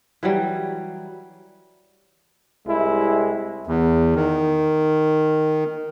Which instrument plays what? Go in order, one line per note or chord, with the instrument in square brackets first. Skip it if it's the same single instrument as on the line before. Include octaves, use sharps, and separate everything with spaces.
[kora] E3 F#3 G3
[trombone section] C2 G#3 E4
[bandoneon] E2
D#3